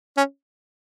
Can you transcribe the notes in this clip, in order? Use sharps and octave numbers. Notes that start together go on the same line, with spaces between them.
C#4